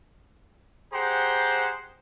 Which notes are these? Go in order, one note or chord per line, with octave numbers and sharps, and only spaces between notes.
G4 G#4 C5 F#5 A#5 C6